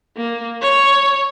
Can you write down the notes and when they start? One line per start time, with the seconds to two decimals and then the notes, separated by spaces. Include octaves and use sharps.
0.17 A#3
0.62 C#5